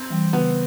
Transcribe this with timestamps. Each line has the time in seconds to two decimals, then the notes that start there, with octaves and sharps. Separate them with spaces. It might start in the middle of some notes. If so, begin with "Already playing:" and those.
Already playing: C4
0.10 E3 G3
0.33 C#3 B3